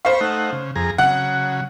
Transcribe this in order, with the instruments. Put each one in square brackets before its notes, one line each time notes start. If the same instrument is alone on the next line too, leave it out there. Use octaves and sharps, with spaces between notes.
[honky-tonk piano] C5 F5 [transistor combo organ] B5 C#6
[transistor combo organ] A3 D#4 F#5
C#3
F2 G#4 A#5
[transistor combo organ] C#3 F#3 [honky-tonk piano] F#5